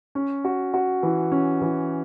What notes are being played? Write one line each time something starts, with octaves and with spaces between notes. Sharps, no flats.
C#4
F#4
F#4
E3
C#4
E3